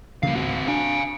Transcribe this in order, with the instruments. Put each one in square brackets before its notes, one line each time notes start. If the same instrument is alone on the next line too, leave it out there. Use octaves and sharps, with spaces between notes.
[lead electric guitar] G2 F5 [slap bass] C#3 F3 A#3
[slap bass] C#2 G#2 [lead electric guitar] C4 F#4
[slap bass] D4 [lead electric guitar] F5 G#5